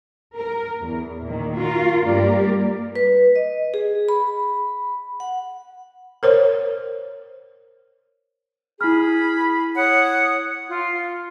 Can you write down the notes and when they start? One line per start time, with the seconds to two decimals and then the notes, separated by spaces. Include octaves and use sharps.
0.36 A#4
0.84 E2
1.23 A#2 D#3
1.58 F4 F#4 A#4
2.06 G2 G3 A#3 G4 A#4 D5
2.96 B4
3.36 D#5
3.74 G#4
4.09 B5
5.20 F#5
6.23 A#4 C5 C#5
8.81 E4 G#4 B5 F6
9.76 C#5 F#5 D#6
10.69 F4